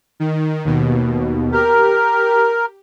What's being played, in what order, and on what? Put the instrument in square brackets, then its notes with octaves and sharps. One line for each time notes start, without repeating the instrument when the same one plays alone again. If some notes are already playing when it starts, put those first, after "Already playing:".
[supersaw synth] D#3
D#2 B2
[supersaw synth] G4 [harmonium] A#4